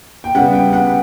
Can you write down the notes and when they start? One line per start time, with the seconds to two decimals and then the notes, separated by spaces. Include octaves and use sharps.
0.24 G5
0.35 C#3 G3 B3 F#5
0.54 G5
0.73 F#5